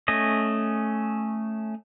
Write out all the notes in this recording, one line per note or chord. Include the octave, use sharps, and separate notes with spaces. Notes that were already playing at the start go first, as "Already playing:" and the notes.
A3 C#4 D#5